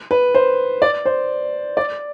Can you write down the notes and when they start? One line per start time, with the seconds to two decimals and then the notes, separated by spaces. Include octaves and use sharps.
0.11 B4
0.34 C5
0.82 D5
1.06 C5
1.77 D5